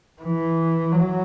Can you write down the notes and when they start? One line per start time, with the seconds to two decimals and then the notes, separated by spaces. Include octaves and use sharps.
0.22 E3
0.92 F#3